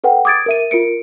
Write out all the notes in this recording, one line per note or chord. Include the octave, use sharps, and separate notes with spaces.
A4 B4 F#5 G5
D6 D#6 G#6 A6 D7
A#4 E5 D#7
F4 A#4 C#7 D7